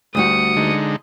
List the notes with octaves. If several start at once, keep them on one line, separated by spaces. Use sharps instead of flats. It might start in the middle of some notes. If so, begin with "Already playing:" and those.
D2 G3 F#4 D#6 C#7
D3 G#3 D#4